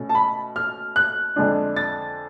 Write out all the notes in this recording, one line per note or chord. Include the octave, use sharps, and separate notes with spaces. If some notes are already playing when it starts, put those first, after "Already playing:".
Already playing: B2 A3 C#4
A5
B5
F6
F#6
F2 D3 G#3 D4
A6